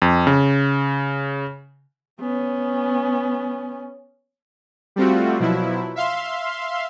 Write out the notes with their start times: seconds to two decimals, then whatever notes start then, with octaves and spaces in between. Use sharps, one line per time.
0.02 F2
0.27 C#3
2.20 B3 C#4
4.96 G3 A3 C4 F4 F#4
5.40 B2 F3 F#3 E4
5.96 E5 F5 C6